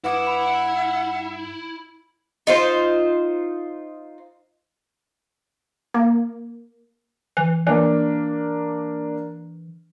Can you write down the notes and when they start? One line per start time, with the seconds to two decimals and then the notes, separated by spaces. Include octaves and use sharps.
0.04 G2 E4 B4 F#5 D6 D#6
0.27 B5
2.47 D#4 F4 C5
5.94 A#3
7.37 E3
7.67 E3 A#3 D4